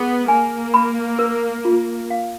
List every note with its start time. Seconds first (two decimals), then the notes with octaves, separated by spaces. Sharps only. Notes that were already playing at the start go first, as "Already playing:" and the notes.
Already playing: B3 G#4
0.28 A#3 G#5
0.74 B5
1.19 A#4
1.65 F4
2.10 F5